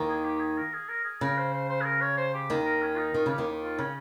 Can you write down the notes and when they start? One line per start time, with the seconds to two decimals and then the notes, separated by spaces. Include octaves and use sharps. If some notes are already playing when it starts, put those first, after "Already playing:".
Already playing: D#2 D#3
0.08 G#4
0.25 G4
0.40 G#4
0.57 A#4
0.73 G#4
0.89 A#4
1.04 G#4
1.21 C#3 A#4
1.38 C5
1.54 C5
1.69 C5
1.81 G#4
1.85 A#4
2.01 C#5
2.17 C5
2.34 G4
2.50 D#2 D#3
2.65 A#4
2.83 C#4
2.94 F4
2.97 D#4
3.14 D#3 F4
3.26 C#3 G4
3.38 D#2 D#3
3.63 F4
3.79 C#3 C#4